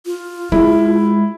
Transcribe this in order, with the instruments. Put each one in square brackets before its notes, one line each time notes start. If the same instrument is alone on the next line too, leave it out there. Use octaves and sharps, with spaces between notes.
[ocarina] F4
[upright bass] G#3 [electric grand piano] E4